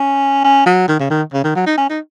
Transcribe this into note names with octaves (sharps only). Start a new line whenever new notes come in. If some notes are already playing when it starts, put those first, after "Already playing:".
Already playing: C#4
C#4
F#3
D#3
C#3
D#3
C#3
D#3
F#3
D#4
C#4
D#4